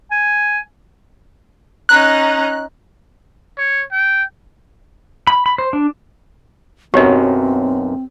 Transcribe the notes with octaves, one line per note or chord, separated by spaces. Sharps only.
G#5
C#4 D#4 A#5 F#6
C#5
G5
B5
B5
C5
D4
B1 F#2 C4 G4 C#5 D#5